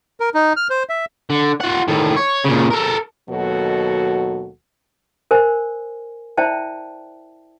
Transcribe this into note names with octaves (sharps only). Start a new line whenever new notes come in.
A#4
D#4
F6
C5
E5
D3
F4 F#5
A2 D#3
C#5
A#2 C#3
A4 A#4
D#2 B2 F#3 F#4 A4
A#4 C5 G#5
E4 C5 D5 E5 G5 A5